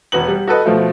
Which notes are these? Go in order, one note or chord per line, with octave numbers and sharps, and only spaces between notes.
E1 F#4 B4 F#7
G3
F#4 A4 B4 D#5
B2 F3 A3